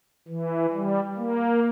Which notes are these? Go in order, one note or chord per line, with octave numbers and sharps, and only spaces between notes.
E3
G3
A#3